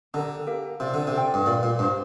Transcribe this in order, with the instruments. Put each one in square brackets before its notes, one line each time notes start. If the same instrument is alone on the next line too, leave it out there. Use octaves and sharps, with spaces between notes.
[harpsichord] D3 [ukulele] D4 G4 A#4
[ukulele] G4 A#4 F5
[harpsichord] C3 [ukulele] F4 D5 F5
[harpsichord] D3
C3
[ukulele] F4 D5 G5
[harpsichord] G2
[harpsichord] A#2 [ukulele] A#4 D5 F5
[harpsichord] A#2
[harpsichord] G2 [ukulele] D4 G4 C5 F5